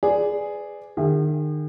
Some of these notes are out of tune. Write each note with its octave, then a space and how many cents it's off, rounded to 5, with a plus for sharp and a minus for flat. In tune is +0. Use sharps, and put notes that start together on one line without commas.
G#4 +0 B4 +35 D5 +0
D#3 -40 G#4 -45 E5 +15